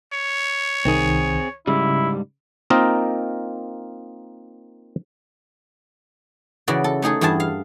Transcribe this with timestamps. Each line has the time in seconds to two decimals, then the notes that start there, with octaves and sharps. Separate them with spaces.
0.13 C#5
0.85 C2 D#3 C4 G#4
1.67 G#2 C#3 G3 E4
2.70 A#3 C4 D#4 F4 A#4 D#5
6.68 C#3 E3 F#4 D5
6.84 A4
7.02 A3 D#4 G#4 A4
7.21 E2 G2 E4 G#4 A5
7.40 F5